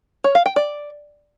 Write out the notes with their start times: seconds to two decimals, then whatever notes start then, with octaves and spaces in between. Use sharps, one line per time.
0.24 C#5
0.35 F5
0.46 G5
0.56 D5